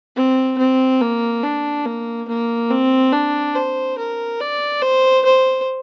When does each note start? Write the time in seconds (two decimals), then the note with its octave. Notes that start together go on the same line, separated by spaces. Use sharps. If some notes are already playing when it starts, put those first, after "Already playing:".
0.16 C4
0.59 C4
1.01 A#3
1.43 D4
1.86 A#3
2.28 A#3
2.70 C4
3.13 D4
3.55 C5
3.98 A#4
4.40 D5
4.82 C5
5.25 C5